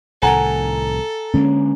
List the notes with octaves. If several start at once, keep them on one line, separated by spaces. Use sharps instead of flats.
C2 A2 D#3 A4 F#5 G#5 A#5
D3 G#3 A#3 C#4